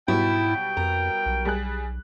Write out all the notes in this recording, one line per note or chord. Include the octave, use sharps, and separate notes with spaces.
G#2 B2 F#3 G3 E4 G5
F2 A#4
B1
G3 G#4 F#6